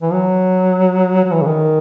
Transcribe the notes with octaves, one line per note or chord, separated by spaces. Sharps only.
E3
F#3
F#3
E3
C#3
D#3